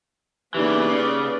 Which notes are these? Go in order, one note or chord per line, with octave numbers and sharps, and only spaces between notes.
C#3 E3 A#3 B3 D#4 G4 B4 D5
C#3